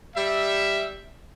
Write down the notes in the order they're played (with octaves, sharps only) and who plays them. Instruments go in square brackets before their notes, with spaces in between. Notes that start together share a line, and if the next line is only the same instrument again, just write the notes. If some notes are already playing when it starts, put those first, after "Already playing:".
[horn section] G3 E5